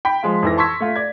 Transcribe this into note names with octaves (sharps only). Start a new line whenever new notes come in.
G5 B5 B6
F3 G#3 F4
F2 E3 A#6
A5 C6 C#6 E6 G#6 B6
A3 F4
D5 G#6